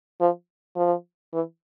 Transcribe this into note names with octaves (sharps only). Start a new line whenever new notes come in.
F3
F3
E3